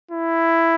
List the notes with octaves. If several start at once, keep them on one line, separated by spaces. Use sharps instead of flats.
E4